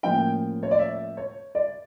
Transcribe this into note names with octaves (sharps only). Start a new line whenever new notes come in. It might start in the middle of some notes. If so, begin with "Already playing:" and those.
A2 F3 A#3 C#4 G5
C#5
D5
E5
C#5
D5